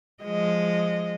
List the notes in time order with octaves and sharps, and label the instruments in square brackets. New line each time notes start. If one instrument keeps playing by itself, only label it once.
[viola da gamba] F3 G#3 D#5